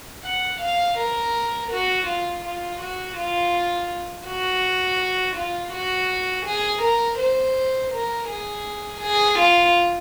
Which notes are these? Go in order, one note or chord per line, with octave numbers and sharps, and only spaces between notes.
F#5
F5
A#4
F#4
F4
F4
F#4
F4
F#4
F4
F#4
G#4
A#4
C5
A#4
G#4
G#4
F4